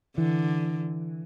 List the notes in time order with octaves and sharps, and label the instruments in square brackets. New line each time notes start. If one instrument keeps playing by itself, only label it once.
[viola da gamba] D3 [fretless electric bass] E3